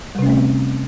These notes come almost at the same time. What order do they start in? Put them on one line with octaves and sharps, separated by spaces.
G3 C3 C#4 A3 C4